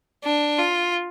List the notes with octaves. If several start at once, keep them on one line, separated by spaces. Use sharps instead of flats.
D4
F4